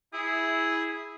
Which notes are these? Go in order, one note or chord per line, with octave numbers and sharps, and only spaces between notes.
E4 G#4